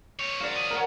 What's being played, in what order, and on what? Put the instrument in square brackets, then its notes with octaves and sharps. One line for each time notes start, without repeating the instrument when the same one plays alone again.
[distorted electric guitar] C4 C#5
[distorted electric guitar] F#3 [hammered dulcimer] C5 D5 F5
[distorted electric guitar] C#4 D#5
[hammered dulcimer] A#4 F#5